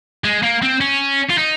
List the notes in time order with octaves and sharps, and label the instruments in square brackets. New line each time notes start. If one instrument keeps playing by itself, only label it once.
[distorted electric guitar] G#3
A#3
C4
C#4
F4
D#4